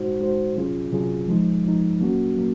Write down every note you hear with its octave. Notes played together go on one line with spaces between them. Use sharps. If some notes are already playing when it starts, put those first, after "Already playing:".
Already playing: G#3 D#4 F#4 C5
G#3 D#4 F#4 C5
C3 F#3 C#4 F4 G#4
C3 F#3 C#4 F4 G#4
F3 G#3 D#4
F3 G#3 D#4
F#3 A#3 C#4 F#4
F#3 A#3